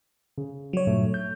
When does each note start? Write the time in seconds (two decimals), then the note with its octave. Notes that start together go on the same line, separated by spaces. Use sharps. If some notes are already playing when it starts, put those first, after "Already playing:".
0.38 C#3
0.73 F#3 C#5
0.87 G2 A#2 A3
1.14 G6